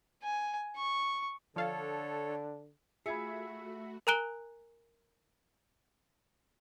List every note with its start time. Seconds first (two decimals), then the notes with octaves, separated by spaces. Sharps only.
0.23 G#5
0.77 C#6
1.56 D3 F3 D4 A4 C#5 F5 A5
3.06 A3 F4 F#4 G#4 E5 B5 G#6 C#7
4.07 A#4 G#5 A#5 F#6 D7 G7